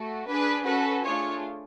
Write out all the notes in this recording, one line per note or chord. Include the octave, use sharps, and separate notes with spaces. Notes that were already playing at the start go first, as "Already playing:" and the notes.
Already playing: A3 F#4
D4 G#4 B4
C#4 F#4 A4 B4
A3 D4 F4 G#4 C#5